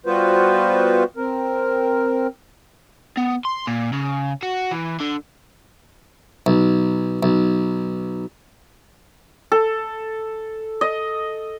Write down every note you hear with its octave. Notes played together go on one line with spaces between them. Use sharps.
G3 B3 F4 F#4 B4 C5
C4 A#4
B3
C6
A#2
C#3
F#4
E3
D3
B1
B1
A4
D#5